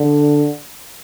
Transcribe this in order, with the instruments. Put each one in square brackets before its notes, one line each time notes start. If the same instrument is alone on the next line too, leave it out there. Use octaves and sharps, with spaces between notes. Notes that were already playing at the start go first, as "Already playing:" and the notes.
Already playing: [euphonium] D3